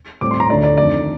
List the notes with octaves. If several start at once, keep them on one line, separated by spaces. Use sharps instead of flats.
A2 G3 C4 D6
C6
A#5
D2 D3 A3 D5
D5
F2 D#3 A3 D4 D5